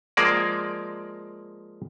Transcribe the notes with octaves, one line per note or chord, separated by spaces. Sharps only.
F3 G#3 A#3 D5